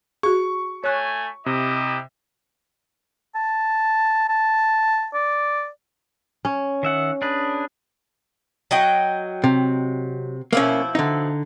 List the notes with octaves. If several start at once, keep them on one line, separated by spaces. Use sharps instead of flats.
F#4 G#4 C#6
A3 C#5 G#5 F#6
C3 E4 G4 D#5
A5
A5
D5
C#4
D#3 E5 F#5
D4 G#4 B4
F#3 D#5 G5
C3
B2 F3 A#3 C#4 E4
D3 D#4